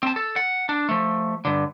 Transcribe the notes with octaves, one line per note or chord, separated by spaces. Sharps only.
C4 A5
A4
F#5
D4
F3 A3
G2 D3